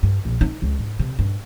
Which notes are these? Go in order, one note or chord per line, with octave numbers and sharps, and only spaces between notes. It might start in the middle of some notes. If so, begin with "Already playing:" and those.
G2
A#1
D#4
C#2
G#2
C3
G2